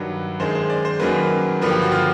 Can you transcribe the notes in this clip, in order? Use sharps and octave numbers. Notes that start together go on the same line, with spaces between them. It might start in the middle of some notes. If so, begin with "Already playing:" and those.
Already playing: G2 D#3 F#3 B4
F#2 D#3 G#3 C5
C5
D5
C5
F#2 D#3 F#3 A#3 B4
G2 D3 F3 A#3 B4
G4
F#4
F4